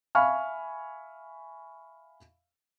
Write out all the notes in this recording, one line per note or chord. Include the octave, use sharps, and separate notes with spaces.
E5 F5 G#5 B5 C#6 F6